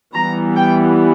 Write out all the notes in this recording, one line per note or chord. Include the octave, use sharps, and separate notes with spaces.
E3 G3 B3 A#5
G5